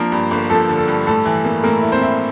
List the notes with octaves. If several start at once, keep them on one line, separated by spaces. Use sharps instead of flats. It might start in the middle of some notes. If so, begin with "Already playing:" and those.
Already playing: F3 A#3 D4 A#4
G2
G1
F3 A4
D3
A4
G2
A2 A4
E3
A#3
A2 A#3 A#4
E4
C4 C5
E4